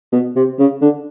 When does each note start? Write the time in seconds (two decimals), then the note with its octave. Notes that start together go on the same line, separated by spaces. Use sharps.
0.12 B2
0.36 C3
0.59 C#3
0.81 D3